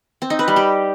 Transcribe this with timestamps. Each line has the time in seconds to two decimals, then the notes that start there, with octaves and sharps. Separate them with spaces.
0.22 C4
0.30 D#4
0.39 B4
0.48 G3
0.56 G4